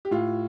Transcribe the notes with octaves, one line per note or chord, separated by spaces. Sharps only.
G4
A2 F4